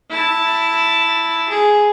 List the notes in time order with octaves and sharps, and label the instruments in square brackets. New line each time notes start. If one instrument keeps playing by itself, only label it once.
[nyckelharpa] E4 A5
G#4